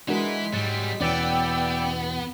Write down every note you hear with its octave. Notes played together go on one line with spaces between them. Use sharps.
E3 G#3 D4 E4 F#4 A#4 B6
G#2 F#3 G3 A6 C#7
E2 B2 E3 B3 C#4 D5 G5 E6